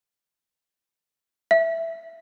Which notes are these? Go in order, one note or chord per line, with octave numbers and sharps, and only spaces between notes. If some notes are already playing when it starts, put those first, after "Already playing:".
E5